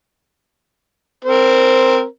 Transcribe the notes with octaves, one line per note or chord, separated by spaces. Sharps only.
C4 A#4 C5